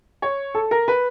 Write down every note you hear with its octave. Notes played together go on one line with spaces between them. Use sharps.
C#5
A4
A#4
B4